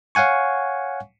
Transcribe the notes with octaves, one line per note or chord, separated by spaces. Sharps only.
C#5 F5 F#5 G#5 C#6